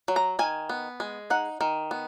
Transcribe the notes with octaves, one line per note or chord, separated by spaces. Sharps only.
F#3
A#5
D#3 G#5
B3
G#3
D#4 F#5
D#3
B3